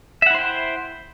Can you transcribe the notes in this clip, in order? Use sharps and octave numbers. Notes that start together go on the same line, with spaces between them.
E4 C5 E5 F#5 G5